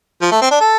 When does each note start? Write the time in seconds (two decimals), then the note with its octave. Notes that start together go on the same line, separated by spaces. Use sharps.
0.22 F3
0.31 A3
0.42 C4
0.51 D4
0.61 A4